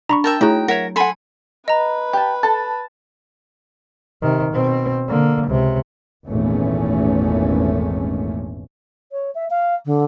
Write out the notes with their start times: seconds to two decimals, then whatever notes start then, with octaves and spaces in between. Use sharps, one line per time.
0.09 D4 A#5 B5 C#6
0.24 A#4 E5 G5 A5
0.41 A3 D#4 E4 F#4 G#4 C#5 G5 A#5
0.68 F#3 A#4 C#5 E5 F#5
0.96 A4 F#5 G#5 B5 C6
1.68 B4 D#5 A#5
2.13 G4 A5
2.43 A4 A5
4.22 C3 D#3
4.53 B2 C4
5.08 D3 A#3
5.47 C#2 C3
6.29 G#1 E2 A#2 A3 C#4
9.12 C#5
9.35 E5
9.50 F5
9.85 D3